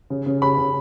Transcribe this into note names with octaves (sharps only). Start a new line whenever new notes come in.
C#3
C#3
C#3 B5
C#3